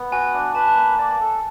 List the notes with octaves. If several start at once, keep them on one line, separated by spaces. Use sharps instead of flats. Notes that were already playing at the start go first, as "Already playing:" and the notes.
Already playing: B3
F#4 G#5
D4
B4 A5
A#3
D5
A4